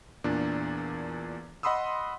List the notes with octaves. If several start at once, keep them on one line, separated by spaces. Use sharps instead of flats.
E2 A#2 D4
D#5 F#5 B5 C6 D#6 E6